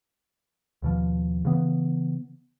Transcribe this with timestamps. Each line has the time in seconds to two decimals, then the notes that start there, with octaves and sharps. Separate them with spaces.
0.82 D#2 B2 F3
1.45 C#3 E3 B3